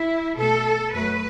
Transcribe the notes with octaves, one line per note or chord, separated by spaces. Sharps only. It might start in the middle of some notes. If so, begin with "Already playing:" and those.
Already playing: E4
B2 A3 A4
F#2 F#3 A3 B4